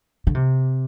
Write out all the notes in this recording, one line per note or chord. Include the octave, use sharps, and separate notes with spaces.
D3
C3